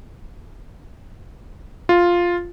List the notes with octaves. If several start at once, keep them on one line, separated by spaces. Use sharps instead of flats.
F4